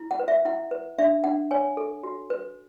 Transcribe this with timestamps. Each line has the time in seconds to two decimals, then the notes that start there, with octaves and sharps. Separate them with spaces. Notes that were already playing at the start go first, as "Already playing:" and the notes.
Already playing: E4
0.11 F#5
0.19 B4
0.28 E5
0.45 E4 F#5
0.71 B4
0.98 D4 E5
1.24 D4 F#5
1.51 C#5 G#5
1.77 A4
2.03 F#4
2.30 B4